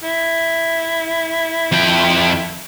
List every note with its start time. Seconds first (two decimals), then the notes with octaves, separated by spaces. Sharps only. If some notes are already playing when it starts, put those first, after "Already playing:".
0.03 E4
1.72 F2 G5